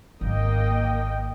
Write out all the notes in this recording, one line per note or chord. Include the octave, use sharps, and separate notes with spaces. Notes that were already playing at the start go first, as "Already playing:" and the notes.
G#1 A#3 D#5 G5